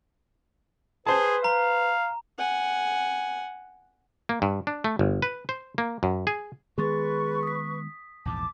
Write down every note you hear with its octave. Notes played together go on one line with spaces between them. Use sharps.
G#4 B4 C5 A5
F5 A#5
F#5 G#5
A#3
G2
D4
A3
G1
B4
C5
A#3
F#2
G#4
D#3 G#3 B3 G#4 B4 C6 C#6 A6
D#6 B6
A#1 E2 G#2 A5 D6